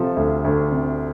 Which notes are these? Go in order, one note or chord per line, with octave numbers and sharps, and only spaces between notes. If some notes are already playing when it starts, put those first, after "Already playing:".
Already playing: C3 F3 A4
D2
D2
C3